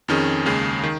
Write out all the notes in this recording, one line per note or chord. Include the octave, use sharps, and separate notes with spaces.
F2 D#3 C#4 G#4
D#2 C#3 G#3
D#3